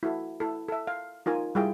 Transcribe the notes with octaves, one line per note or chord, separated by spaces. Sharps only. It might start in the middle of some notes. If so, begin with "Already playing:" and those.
E4 F#4 A4
E4 A4
A4 E5
F5
D#4 F4 A#4 G#5
G3 E4 F4 G#4 G5